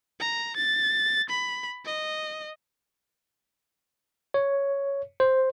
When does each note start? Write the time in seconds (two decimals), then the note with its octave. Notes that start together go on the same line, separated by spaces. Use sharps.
0.20 A#5
0.57 A6
1.29 B5
1.85 D#5
4.34 C#5
5.20 C5